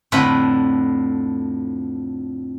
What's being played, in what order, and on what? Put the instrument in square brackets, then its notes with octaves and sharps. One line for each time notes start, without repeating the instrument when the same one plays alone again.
[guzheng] F2 A2 D3 B4 B5